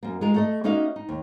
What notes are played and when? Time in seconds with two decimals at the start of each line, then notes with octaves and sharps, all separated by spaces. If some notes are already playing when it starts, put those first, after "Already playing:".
0.03 F#2 A#3
0.21 G#3 F4 A#4
0.34 A3 A4 D#5
0.64 A#3 C#4 D#4 F#4 E5 F5
0.96 D#4
1.09 D#2